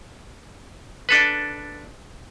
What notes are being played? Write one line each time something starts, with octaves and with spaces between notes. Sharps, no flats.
D4 A4 B4